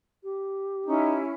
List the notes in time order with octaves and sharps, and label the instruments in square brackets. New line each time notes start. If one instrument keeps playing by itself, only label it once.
[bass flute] G4
[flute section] C#4 E4 [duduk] D#4